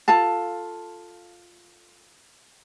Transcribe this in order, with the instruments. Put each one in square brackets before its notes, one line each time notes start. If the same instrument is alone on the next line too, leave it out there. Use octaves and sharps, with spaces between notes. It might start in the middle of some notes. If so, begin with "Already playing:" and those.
[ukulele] F4 A4 F5 A5